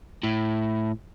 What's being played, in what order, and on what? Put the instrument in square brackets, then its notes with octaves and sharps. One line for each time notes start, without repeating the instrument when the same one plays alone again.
[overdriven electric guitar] A2